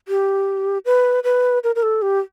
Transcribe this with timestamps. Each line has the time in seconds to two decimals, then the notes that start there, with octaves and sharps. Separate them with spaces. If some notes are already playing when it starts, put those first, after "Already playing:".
0.08 G4
0.85 B4
1.24 B4
1.64 A#4
1.76 A#4
1.83 A4
2.02 G4